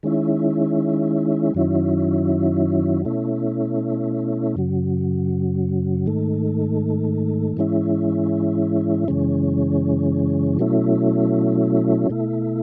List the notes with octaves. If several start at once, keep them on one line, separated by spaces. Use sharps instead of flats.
D#3 G#3 C#4 E4
F#2 D#3 F#3 C#4 E4
B2 A3 C#4 E4
F#2 C#3 F#3
G#2 D#3 A3
G#2 E3 G#3 C#4 E4
F#2 C#3 E3 G#3 C#4
B2 F#3 A3 C#4 E4
B2 A3 E4